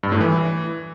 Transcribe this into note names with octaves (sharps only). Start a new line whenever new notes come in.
G2
A2
E3